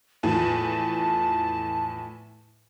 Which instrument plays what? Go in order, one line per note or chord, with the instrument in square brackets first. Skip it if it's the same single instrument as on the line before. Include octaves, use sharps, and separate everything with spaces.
[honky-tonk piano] E2 A2 F3 [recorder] A5